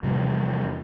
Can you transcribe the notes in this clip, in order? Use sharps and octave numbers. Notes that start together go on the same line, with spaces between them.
E2 C3 F3 G3